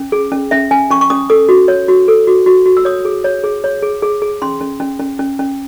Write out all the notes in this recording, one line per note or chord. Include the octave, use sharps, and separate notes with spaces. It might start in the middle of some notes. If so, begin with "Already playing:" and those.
Already playing: C#4
G#4
C#4
C#4 E5
C#4 G#5
C#4 C#6
C#6
C#4 D#6
A4 D#6
F#4
C#5
F#4
A4
F#4
F#4
F#4
E6
C#5 D#6
G#4
C#5
G#4
C#5
G#4
G#4
G#4
C#4 C6
C#4
C#4
C#4
C#4
C#4